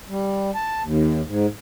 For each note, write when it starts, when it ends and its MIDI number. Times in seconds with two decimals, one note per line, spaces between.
0.09 0.51 55
0.55 0.82 81
0.84 1.21 39
1.27 1.46 44